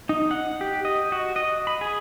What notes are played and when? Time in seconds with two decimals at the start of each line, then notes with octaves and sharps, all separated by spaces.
0.09 D#4
0.31 F#5
0.61 G4
0.85 D#5
1.12 F#4
1.36 D#5
1.67 B5
1.81 G#4